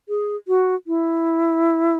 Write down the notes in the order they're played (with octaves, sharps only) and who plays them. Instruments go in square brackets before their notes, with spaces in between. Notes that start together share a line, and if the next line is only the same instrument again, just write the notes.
[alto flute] G#4
F#4
E4